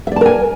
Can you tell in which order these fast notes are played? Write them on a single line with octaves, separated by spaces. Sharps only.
E5 D5 A5 A#4 G#5